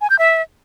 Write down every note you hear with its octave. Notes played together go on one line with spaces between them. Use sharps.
G#5
G6
E5